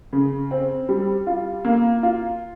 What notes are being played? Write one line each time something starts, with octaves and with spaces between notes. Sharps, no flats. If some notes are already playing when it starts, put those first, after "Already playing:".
C#3
C4
G3
F4
A#3
F4